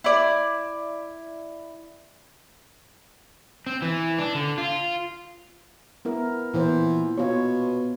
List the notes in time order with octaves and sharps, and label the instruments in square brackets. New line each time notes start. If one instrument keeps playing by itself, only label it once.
[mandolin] E4 D5
[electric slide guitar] C4
E3
D4
D3
F4
[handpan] B3 E4 A#4
[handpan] A#2 B3 C5 [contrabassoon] E3
[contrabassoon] B2 [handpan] F4 C#5